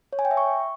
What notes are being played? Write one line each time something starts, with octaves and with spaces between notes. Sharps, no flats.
C#5
G#5
G5
E5
C#6